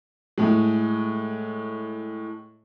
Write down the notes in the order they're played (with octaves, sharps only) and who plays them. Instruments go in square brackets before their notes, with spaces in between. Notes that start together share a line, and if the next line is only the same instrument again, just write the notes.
[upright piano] A2 G#3